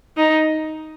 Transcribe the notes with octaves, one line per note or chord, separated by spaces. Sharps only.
D#4